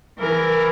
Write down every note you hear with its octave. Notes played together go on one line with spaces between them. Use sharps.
E3 A#4